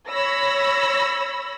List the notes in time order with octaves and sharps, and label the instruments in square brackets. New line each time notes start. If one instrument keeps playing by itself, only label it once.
[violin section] C#5 B5 E6 A#6